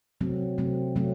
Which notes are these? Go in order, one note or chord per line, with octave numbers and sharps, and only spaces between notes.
C3 F#3 A3 C4
C3 F#3 A3 C4
C3 F#3 A3 C4